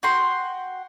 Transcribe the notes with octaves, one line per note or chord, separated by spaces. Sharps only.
F#4 G5 C6